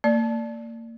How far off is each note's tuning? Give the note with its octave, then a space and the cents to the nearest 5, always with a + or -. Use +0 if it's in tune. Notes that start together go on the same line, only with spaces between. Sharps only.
A#3 -30 D5 +0